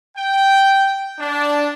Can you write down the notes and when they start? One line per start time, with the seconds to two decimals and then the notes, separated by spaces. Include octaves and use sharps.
0.16 G5
1.19 D4